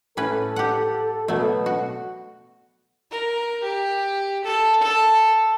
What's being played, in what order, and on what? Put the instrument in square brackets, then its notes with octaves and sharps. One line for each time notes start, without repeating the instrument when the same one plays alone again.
[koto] A2 C#4 B4 [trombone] A4
[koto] G4 F#5
[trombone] B2 [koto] F#3 A3
[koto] F#4
[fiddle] A#4
G4
A4
A4